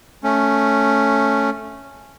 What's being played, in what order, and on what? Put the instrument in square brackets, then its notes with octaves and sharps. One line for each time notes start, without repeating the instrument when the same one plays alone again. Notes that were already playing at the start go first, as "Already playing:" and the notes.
[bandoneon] A3 C#4